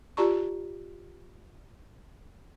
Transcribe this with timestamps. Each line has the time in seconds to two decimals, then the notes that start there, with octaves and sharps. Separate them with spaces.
0.17 F4 G4 D5 A5 A#5 C#6